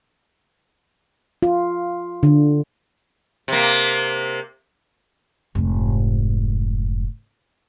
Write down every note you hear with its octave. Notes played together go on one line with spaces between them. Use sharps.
F4
D3
C3 A#3
F1 G#2